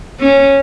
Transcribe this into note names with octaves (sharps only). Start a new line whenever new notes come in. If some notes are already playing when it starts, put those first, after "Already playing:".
C#4